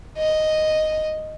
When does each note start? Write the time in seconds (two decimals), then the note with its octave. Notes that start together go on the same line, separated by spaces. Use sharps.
0.17 D#5